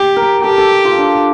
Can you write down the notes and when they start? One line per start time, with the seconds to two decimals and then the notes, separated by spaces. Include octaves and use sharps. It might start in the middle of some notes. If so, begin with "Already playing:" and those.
Already playing: G4
0.16 A#4
0.44 G4 A4
0.58 A4
0.85 F4
0.98 D4